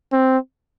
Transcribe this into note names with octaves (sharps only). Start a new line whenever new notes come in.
C4